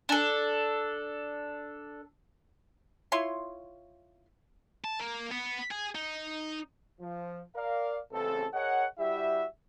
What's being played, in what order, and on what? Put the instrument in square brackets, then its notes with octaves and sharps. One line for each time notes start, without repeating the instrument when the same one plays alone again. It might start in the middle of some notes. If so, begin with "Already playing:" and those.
[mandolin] D4 A4
[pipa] E4 F4 C#5 C6
[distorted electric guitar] A5
A#3
B3
G#4
D#4
[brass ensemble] F3
A#4 D5 F5
A1 E2 C#3 C4 A4
G#4 A#4 C#5 D#5 F#5
G3 E4 F#4 G4 E5